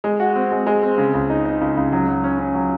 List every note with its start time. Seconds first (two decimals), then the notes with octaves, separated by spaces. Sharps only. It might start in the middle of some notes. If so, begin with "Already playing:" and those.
0.04 G#3
0.20 F#4
0.36 C4
0.52 G#3
0.67 G#3
0.83 C4
0.98 C#3
1.14 C#2
1.30 D#4
1.45 D#4
1.61 C#2
1.77 C#2
1.92 F#3
2.08 F#3
2.24 C#4
2.39 C#4
2.55 F#3